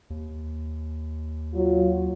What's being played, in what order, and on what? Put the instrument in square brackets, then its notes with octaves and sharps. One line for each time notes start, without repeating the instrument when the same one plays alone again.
[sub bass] D#2
[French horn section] F#3 F4